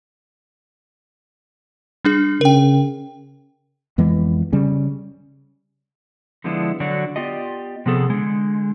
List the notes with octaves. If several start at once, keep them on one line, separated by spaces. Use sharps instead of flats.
G3 D4 G#4
C#3 A#4 G5
F2 E3 G#3 B3
C#3 G3 C#4
D3 F3 G#3 B3 D4 E4
D3 F#3 F#4 D5
B3 F4 G4 D5 D#5
C3 F3 B3 G#4 A4
D3 G#3